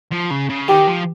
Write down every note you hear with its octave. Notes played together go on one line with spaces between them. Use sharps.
F3
C#3
C#3
D#3 G4
F3